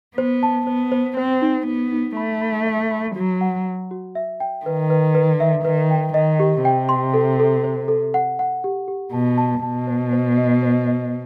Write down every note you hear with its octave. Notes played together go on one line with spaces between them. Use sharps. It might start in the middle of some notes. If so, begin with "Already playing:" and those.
B3 C5
A5
B3 C5
C5
C4 C5
D#4
B3 D#4
D#4
A3 B5
B5
E5
B5
F#3 F#4
F#5
F#5
F#4
E5
G5
D#3 B4
B4
B4
E5
D#3 B4
G5
D#3 D#5
G4
C3 G5
C6
A4
A4
C5
A4
F#5
F#5
G4
G4
B2 A5
A5
B2 A5
C5
C5
D#5
C5
D#5